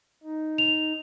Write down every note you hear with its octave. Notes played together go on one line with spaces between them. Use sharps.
D#4
F7